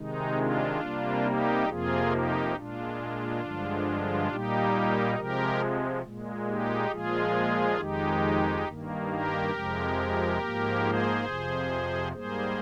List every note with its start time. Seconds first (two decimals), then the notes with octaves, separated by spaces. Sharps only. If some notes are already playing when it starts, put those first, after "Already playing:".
Already playing: C3 D#3 G#3 D#4
0.36 D4 F4
0.79 C3 G3 A#3
1.23 D#4 G4
1.67 F2 C3 F3 A#3 F4 G#4
2.10 D#4 G4
2.53 A#2 G#3 D4 F4
3.41 G2 D3 F3 G#3
4.28 A#2 G3 A#3 D#4 G4
5.15 C3 F3 G#3 G4 A#4
6.03 A#2 G#3
6.46 D#4 G4
6.89 A#2 F3 G#3 F4 G#4
7.77 F2 D#3 G#3 D#4 G4
8.64 G2 D#3 A#3
9.08 G4 A#4
9.51 F2 C3 F3 G#3
10.38 G#2 F3 A#3
10.81 G#4 C5
11.25 F2 C3 F3
12.12 G#2 G3 A#3 G#4 C5